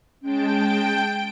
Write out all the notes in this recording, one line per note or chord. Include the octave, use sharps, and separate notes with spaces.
G#3 C#4 G5 A5 D7